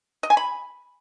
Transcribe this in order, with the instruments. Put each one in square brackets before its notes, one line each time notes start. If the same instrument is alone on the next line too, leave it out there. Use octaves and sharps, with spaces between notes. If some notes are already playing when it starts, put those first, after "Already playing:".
[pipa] D#5
G#5
B5